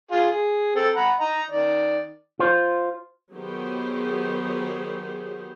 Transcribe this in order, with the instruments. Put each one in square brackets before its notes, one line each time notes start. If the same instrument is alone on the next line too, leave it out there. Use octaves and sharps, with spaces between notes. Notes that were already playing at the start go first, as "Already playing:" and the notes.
[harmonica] F4 G#4
G#4
C4 A4
F#5 A#5 B5
D#5 A#5
D#3 D5
[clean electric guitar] F4 C5
[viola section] D#3 F#3 B3 G4 G#4 C5